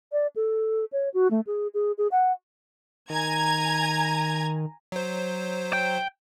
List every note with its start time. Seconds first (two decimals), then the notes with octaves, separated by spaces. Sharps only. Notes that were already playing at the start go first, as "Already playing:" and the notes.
0.12 D5
0.36 A4
0.92 C#5
1.14 F#4
1.31 A3
1.47 G#4
1.74 G#4
1.98 G#4
2.11 F#5
3.10 D#3 G#5 A#5 G#6
4.92 F#3 C5
5.73 G5